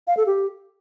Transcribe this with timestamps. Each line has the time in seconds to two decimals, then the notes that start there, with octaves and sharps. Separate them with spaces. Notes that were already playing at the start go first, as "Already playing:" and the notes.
0.07 F5
0.17 A4
0.27 G4